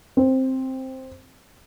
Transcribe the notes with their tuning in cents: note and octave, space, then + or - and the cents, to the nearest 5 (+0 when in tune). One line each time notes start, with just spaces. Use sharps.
C4 +5